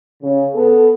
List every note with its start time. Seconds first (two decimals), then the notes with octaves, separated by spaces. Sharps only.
0.22 C#3
0.54 B3 A4